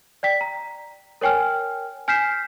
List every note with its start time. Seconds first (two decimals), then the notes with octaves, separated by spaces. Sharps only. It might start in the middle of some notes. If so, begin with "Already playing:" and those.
0.23 D5 G5 B6
0.41 A#5
1.21 A#4 C#5 G5 G#5 F6
2.08 G#5 F6 G6 B6 C7 E7